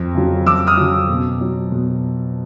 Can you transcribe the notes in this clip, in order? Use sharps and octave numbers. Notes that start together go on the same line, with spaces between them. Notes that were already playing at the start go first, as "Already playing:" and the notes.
Already playing: F2
C#3 F#3
F2 D6 E6
D#6 F6
C#3 F#3
B2
F#3
B2